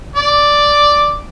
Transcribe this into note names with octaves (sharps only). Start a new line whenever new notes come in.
D5